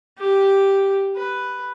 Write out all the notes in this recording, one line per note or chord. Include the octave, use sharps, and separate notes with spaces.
G4
B4